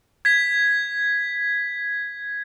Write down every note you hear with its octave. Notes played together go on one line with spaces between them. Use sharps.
G#6 B6